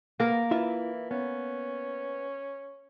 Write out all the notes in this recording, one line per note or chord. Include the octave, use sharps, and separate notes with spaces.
A#3 B3 A#4
E3 E4 F4 E5
B3 C#4